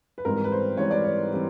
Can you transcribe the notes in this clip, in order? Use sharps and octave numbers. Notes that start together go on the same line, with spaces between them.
B4
G#1 G#2 E3 G3 C4 A#4
B4
C5
G#1 G#2 E3 G3 C4 C#5
D5
C#5
E3 G3 C4